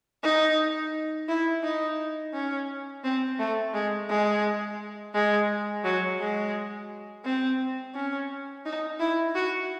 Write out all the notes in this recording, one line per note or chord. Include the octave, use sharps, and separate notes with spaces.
D#4
E4
D#4
C#4
C4
A3
G#3
G#3
G#3
F#3
G#3
C4
C#4
D#4
E4
F#4